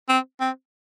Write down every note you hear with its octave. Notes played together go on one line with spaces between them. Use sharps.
C4
C4